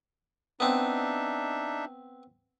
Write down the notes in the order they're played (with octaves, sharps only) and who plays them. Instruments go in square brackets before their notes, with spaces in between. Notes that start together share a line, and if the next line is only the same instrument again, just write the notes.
[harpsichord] B3 C4 [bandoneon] D4 D#4 E5